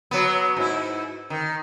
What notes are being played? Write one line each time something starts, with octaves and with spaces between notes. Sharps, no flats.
F#3 B3
G#2 E4
D#3